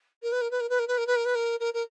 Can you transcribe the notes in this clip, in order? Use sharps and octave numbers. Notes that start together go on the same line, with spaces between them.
A#4
B4
A#4
B4
A#4
B4
A#4
B4
A#4
B4
A#4
B4
A#4
A#4
A#4